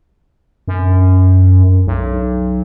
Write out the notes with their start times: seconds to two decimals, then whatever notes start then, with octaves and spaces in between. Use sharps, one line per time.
0.68 F#2
1.87 B1